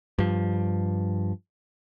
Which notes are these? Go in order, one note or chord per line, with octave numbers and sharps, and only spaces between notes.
G2 F3